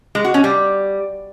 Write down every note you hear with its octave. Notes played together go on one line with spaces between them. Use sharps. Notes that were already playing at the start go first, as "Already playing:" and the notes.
G#3
F#4
C#4
G3